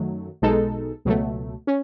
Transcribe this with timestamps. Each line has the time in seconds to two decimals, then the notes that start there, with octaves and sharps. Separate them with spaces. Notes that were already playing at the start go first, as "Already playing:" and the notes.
Already playing: F#2 D#3 F#3 A3
0.42 B1 B2 G#3 D#4 A4
1.05 C#2 B2 F#3 A3
1.67 C#4